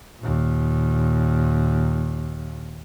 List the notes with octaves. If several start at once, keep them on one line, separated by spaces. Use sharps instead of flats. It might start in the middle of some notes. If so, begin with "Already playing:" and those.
D#2 A#2